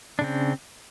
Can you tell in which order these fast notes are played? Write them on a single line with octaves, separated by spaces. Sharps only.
D4 C#3 C4